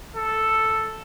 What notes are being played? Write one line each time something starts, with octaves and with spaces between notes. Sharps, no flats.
A4